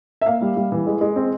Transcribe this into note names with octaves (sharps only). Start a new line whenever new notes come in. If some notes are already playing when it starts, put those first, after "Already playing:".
E5
A#3 F5
G3
G3
E3
G#3
G#3
C4